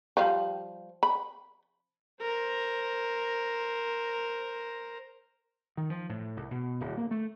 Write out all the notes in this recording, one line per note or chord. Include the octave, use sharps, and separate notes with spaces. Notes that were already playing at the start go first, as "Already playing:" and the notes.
F3 G3 F5
B5
A#4 C5
D#3
F3
A2
C2
B2
D1
A#3
A3